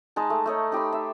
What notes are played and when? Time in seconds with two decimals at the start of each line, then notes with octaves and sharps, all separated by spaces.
0.16 G#3 D#4 A5
0.30 A3
0.46 A3 D#4 C#5
0.72 D#4 G4 B5 C6
0.92 E5